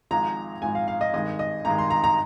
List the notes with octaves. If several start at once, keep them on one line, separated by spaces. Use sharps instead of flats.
G#1 G#2 F3 G#3 A#5
G#1 G#2 F3 G#3 G#5
F5
F5
D#5
G#1 G2 D#3 G#3 D#5
D#5
G#1 G2 D#3 G#3 A#5
C6
A#5
A#5